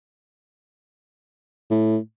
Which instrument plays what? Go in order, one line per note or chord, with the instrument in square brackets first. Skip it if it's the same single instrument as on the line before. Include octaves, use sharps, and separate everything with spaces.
[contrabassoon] A2